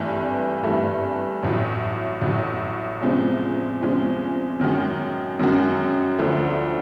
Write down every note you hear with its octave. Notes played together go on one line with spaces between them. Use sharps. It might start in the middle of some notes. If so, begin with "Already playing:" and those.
Already playing: G#1 G2 E3 A3
G#1 G2 E3 A3
A1 A2 F#3
A1 A2 F#3
E2 C3 F3 G#3 C#4
E2 C3 F3 G#3 C#4
F#2 D#3 G#3 C#4 F#4
F#2 D#3 G#3 C#4 F#4
D2 D3 F3 A3